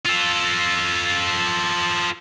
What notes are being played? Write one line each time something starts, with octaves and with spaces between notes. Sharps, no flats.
F4 A4